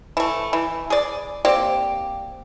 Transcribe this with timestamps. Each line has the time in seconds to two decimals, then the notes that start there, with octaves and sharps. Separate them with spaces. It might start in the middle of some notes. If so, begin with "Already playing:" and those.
0.17 E3 A3
0.53 E3
0.90 G#4 D5
1.45 A#3 C4 G4 D5